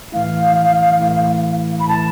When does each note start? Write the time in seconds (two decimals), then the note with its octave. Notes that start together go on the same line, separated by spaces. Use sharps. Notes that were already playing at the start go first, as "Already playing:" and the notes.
0.12 A2 E3 A3 E4 F5
1.00 A2 E3 A3 E4
1.79 B5
1.88 A2 E3 A3 E4 A5